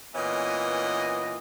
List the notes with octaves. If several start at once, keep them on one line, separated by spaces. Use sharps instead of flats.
A#2 E3 B3 C#4 D#5